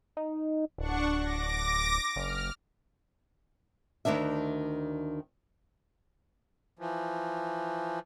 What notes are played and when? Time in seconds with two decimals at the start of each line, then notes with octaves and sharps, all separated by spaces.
0.17 D#4
0.78 D1 D4 F#5 C#6
1.20 D6 A#6
2.16 F#1 F6
4.05 D2 A#2 D#3 D4 E5
6.79 E3 F3